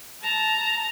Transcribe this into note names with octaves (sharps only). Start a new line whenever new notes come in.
A5 A#5